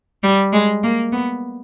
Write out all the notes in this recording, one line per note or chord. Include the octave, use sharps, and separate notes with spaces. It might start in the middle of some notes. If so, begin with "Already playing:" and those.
G3
G#3
A#3
B3